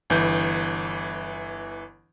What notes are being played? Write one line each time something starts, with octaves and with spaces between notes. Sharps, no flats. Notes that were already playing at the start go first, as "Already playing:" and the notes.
G1 E3 G6